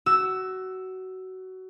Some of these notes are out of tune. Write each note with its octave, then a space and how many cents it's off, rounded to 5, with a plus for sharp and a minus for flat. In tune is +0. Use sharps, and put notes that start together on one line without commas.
F#4 +20 E6 +0